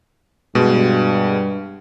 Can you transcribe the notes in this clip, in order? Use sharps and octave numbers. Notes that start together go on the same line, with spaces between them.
G2 B2 G#3